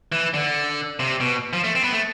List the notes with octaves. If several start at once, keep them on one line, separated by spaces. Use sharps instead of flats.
E3
D3
C3
B2
F3
A3
C4
B3
A3